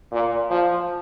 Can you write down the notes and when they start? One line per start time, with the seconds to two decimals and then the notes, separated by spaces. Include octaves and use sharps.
0.12 A#2
0.50 F3